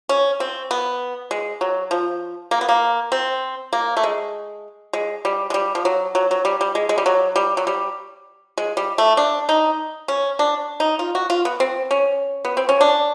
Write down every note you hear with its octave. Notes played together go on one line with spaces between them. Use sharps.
C#4
C4
B3
G#3
F#3
F3
A#3
B3
A#3
C4
A#3
A3
G#3
G#3
G3
G#3
G3
F3
F#3
F#3
F#3
G3
G3
G#3
G#3
G3
F#3
G3
F#3
G3
G#3
G3
A3
D4
D#4
C#4
D4
D#4
F4
F#4
F4
B3
C4
C#4
B3
C4
C#4
D4